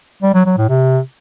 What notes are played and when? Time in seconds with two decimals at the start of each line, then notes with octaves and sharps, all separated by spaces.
0.22 G3
0.34 F#3
0.46 F#3
0.58 A2
0.69 C3